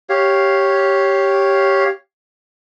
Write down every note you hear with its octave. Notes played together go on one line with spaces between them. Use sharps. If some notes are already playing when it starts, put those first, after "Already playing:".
G4 C#5 F5